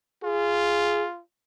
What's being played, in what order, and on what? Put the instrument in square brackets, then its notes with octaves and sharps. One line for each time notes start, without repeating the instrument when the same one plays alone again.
[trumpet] F4 [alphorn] G#4